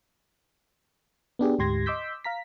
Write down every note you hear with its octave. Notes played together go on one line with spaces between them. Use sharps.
B3 D4 G4 G#4
D2 G#2 G4 C6 G#6 A#6
D#5 C6 D6 E6 G6 B6
F5 A#5 B6